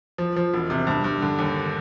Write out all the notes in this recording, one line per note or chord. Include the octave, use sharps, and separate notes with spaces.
F3
F3
E1
C3
G2
G2
D3
D#2